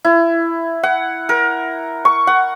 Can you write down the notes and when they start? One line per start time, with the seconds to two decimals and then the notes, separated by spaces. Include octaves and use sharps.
0.05 E4
0.83 F#5
1.29 A#4
2.05 C#6
2.27 F#5